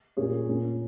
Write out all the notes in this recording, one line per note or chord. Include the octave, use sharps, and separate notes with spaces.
A#2 A#3 C#4 G#4 C#5
A#2 A#3 C#4